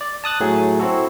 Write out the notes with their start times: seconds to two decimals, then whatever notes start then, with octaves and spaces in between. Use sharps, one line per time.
0.01 D5
0.24 A5 D#6 F#6 A6
0.40 A2 F#3 A3 G#4
0.79 C4 E4 F#4 A4